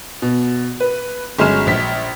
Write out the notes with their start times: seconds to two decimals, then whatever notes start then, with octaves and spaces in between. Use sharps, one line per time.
0.22 B2
0.80 B4
1.39 G1 F#3 G#3 C#4 F6 E7
1.67 A#1 B6